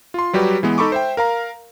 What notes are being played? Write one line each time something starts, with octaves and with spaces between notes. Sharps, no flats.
F4 C6
F#3 G3 F#4 G4 B4
E3 G#3 B3
D#4 A4 B5 C#6 D6
C5 E5 G5
A#4 F5 A#5